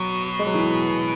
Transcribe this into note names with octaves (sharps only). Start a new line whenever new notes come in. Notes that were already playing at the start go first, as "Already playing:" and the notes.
Already playing: B2 F#3
G#3
F#3
E3